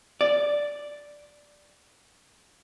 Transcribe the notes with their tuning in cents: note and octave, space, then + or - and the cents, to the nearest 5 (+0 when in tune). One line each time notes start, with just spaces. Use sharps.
D5 +0